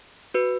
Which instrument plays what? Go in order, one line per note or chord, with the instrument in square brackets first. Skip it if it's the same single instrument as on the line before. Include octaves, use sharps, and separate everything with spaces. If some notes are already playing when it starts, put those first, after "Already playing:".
[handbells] F#4 B4